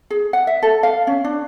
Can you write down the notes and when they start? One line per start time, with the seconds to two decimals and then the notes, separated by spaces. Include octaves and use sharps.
0.10 G#4
0.33 F#5
0.47 E5
0.62 A4
0.83 F5
1.07 C#4
1.24 D4